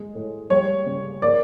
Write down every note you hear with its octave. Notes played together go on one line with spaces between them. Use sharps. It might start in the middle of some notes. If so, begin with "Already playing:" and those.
Already playing: G#3
A2
G3 C#5
C#3
A#3 D5